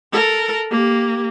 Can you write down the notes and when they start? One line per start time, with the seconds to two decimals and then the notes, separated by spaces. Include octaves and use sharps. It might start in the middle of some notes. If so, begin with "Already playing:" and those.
0.13 A4 A#4
0.71 A#3 G4